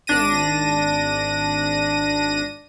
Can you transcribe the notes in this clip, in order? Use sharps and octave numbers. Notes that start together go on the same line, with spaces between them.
G#1 D4 A#6 D#7